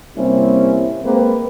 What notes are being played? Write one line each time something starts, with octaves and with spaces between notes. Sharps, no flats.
C3 G3 A#3 C4 C#4 E4
G#3 A#3 C4 B4